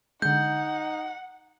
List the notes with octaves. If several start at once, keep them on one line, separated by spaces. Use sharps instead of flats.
D3 G#3 D#4 F#5 G6